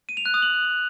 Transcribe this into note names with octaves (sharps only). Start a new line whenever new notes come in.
D#7
F7
F#6
D#6
F#7